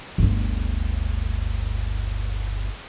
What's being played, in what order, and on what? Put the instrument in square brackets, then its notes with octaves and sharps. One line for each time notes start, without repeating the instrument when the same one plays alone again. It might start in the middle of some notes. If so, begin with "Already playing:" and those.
[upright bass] G1 D2